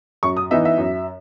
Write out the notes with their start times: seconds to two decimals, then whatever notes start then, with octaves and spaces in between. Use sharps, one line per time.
0.23 F#2 C#6
0.37 D#6
0.51 E3 B3 D#4 E5
0.65 E5
0.78 F#2